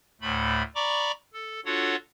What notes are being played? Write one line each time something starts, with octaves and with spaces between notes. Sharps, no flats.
D2 A2 A3 B5
D5 A#5 B5 C#6 D6
A4
D4 F4 F#4 A4 C#5 F#5